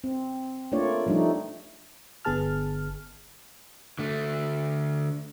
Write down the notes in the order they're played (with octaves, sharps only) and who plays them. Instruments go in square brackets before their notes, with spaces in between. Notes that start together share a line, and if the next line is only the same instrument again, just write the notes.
[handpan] C4
A3 A#3 D4 F4 C#5 D5
F3 G3 A3 D4 D#4
[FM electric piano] G1 D3 B3 G#4 A5 F6
[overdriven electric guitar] D3 A3